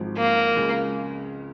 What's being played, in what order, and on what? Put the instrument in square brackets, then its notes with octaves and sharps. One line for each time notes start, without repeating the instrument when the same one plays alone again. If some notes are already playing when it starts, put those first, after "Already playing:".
Already playing: [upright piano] G#1 G#2 F3
[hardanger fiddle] A#3
[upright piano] C#2 C#3 G#3